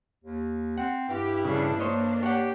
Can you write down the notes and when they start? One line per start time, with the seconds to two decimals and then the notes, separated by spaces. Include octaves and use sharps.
0.24 D#2
0.78 C4 F#5
1.08 G2 E4 G4
1.44 C#3 F3 G3 D4
1.80 A#3 D4 C5 C#5 D#5
2.23 G4 C#5 F#5